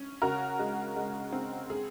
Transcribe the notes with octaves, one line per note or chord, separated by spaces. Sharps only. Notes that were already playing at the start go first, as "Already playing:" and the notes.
Already playing: C#4
C#3 F#4 A#4
G#3
G#3
C4
G#4